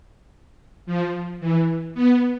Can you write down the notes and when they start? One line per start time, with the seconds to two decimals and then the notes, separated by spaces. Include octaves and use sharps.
0.86 F3
1.40 E3
1.95 B3